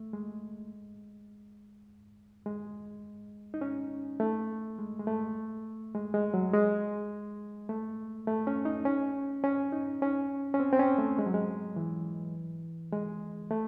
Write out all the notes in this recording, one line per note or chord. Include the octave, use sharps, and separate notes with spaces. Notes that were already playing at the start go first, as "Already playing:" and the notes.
Already playing: A3
G#3
G#3
D#4
C#4
A3
G#3
G#3
A3
G#3
G#3
F#3
G#3
A3
A3
C#4
D#4
C#4
C#4
D#4
C#4
C#4
C4
C4
C#4
A3
G#3
F#3
G#3
E3
G#3
A3